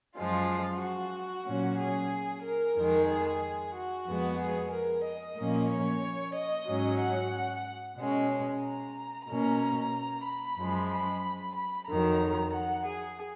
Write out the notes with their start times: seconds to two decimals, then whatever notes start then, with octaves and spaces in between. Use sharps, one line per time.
0.15 F#2 F3 G#3 F4
0.80 F#4
1.46 A#2 F#3 C#4
1.78 G#4
2.44 A#4
2.76 F2 D#3 G#3
3.08 G#4
3.74 F#4
4.06 F2 F3 G#3 B3
4.39 G#4
4.71 A#4
5.05 D#5
5.37 A#2 F3 A#3 C#4
5.70 C#5
6.35 D#5
6.67 G#2 F#3 C#4
7.00 F#5
7.98 B2 G#3 C#4
8.63 A#5
9.28 B2 A#3 C#4 A#5
10.26 B5
10.58 F#2 F3 G#3
10.92 B5
11.56 B5
11.89 F2 D#3 F#3 A#5
12.54 F#5
12.87 G#4